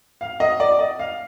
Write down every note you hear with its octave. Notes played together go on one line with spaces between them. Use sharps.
F5
D#5
D5
D#5
F5